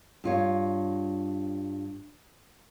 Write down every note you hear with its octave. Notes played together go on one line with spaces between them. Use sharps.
G2 F4 C#5